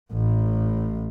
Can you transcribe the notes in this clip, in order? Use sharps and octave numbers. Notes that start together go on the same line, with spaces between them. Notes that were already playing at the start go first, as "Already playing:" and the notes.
A1 A2